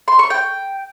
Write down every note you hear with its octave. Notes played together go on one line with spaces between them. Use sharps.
C6
C#6
G5